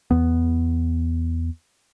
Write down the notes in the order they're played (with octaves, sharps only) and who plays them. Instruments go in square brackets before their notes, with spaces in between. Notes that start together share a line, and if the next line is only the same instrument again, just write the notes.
[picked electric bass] E2 B3